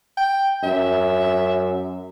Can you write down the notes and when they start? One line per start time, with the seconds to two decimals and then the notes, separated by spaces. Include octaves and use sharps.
0.17 G5
0.63 F#2 E5